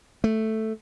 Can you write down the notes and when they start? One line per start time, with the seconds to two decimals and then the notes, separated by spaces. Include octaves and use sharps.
0.24 A3